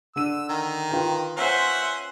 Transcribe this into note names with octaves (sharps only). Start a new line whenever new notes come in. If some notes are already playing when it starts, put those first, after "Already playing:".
D3 E6 D#7
D#3
F4 B4 G5
C#4 C5 E5 F#5